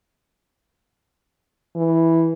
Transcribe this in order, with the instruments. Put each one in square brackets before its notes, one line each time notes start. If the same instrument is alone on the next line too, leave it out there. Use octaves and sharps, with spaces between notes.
[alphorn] E3